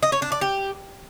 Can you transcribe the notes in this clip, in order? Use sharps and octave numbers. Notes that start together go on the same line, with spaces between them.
D#5
C#5
D4
D5
G4